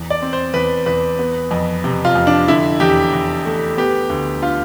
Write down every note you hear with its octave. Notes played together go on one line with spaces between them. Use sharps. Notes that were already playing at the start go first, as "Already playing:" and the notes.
Already playing: E2
D5
C4
C5
E2 B4
E2 B4
B3
F2
C3
F4
F2
D4
D3 E4
E2 G4
E2
A3
B3 G4
D2
D3 F4